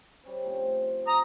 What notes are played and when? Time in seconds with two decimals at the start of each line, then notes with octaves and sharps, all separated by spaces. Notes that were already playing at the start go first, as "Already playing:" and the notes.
0.23 G3 C#4 C5
0.46 A2 F3 C4
1.07 A#5 D#6